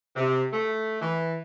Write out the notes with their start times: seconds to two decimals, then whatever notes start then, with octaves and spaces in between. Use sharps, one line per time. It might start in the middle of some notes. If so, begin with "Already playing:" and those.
0.16 C3
0.53 A3
1.02 E3